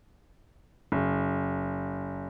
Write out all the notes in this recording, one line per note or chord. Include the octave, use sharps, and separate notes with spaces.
F#1